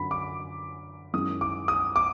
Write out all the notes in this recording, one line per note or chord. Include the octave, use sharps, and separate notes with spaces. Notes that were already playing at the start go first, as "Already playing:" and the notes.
Already playing: F#2 D3 F#3 B5
D6
F#2 D#3 G#3 C#4 E4 D#6
D6
D#6
D6